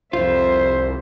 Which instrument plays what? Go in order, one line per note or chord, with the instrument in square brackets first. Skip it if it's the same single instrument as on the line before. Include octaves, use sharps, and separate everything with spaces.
[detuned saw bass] C2 [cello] F2 E5 [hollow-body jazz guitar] F4 [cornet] C5